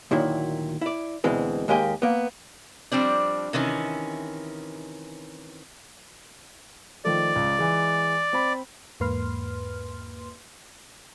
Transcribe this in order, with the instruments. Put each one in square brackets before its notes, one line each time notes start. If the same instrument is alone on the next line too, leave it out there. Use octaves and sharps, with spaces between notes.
[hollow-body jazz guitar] D2 A#2 D#3 F#3 E4
E4 D5
D2 B2 E3 G#3 C4
D#2 G#3 A#3 G4 D#5 G#5
A#3 B3
[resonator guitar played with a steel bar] F3 G3 C4 D4
C3 D#3 E3 C#4
[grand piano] D#3 F3 A3 [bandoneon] D5
[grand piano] C#2
E3 G#3
C4 B5
[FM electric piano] E2 G#2 A#3 B4 C6 F6